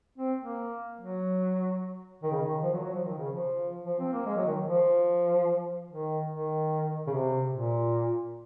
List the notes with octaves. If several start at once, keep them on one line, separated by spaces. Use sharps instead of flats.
C4
A#3
F#3
D#3
C#3
D#3
F3
F#3
F#3
F3
D#3
C#3
F3
F3
C4
A#3
G#3
F#3
D#3
F3
D#3
D#3
C#3
C3
A#2